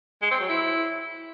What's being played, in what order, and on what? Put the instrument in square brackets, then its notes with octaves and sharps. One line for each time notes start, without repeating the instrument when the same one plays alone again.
[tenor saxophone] G#3
C4
F#3
E4